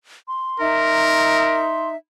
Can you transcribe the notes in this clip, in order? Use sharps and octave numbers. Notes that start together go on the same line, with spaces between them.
C6
D#4 A#4 E5